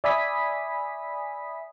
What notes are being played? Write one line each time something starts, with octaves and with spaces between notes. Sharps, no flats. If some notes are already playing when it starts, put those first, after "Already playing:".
D5 E5 G#5 B5 D#6 B6